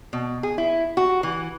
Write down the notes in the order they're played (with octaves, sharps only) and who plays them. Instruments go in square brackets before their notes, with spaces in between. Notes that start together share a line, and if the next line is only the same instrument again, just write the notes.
[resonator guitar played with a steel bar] B2
G#4
E4
F#4
E3